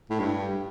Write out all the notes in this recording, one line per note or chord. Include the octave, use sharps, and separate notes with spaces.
A2
G2